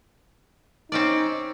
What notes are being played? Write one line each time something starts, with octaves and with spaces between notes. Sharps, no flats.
C4 C#4 D#4 D5